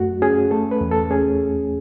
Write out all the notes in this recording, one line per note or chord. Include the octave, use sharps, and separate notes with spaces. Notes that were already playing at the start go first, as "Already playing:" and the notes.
Already playing: F#2 A3 F#4
C#4 G#4
A3 A4
B4
E2
A4
C#4 G#4